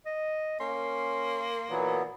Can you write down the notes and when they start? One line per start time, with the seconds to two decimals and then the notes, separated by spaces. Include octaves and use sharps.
0.06 D#5
0.60 A#3 C#4 C6
1.69 A#2 E3 F#3 B3